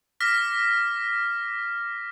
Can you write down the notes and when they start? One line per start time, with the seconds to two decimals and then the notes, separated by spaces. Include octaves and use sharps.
0.20 D6 F6 A#6 B6